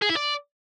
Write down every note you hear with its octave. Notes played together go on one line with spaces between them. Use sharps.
G#4
E4
D5